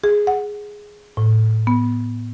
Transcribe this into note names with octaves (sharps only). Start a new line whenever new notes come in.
G#4
F#5
A2
B3